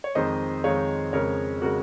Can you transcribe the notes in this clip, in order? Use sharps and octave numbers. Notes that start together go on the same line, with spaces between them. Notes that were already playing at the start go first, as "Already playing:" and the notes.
C#5
F2 D#3 G#3 C5 D#5
F2 D#3 G#3 C#5 F5
F2 C#3 G#3 A#4 C#5
C#3 G#3 F#4 A#4